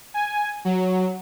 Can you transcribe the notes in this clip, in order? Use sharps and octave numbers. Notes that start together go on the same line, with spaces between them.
G#5
F#3